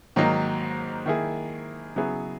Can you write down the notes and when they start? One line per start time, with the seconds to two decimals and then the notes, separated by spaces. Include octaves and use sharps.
0.16 G#2 D#3 F#3 A#3 D#4
1.06 D#3 A#3 E4 G#4
1.96 C#3 F#3 B3 E4 G#4